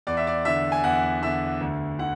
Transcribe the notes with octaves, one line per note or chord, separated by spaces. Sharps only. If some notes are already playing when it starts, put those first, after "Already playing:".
E2 D5
E5
D5
D3 E5
G#5
E2 F#5
D3 E5
D2
D3 F#5